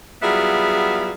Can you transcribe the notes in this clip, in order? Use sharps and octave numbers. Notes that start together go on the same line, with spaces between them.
F#3 G3 B3 E4 F4 G#4